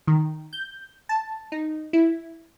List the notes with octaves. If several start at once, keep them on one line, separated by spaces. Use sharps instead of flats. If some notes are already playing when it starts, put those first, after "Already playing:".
D#3
G6
A5
D#4
E4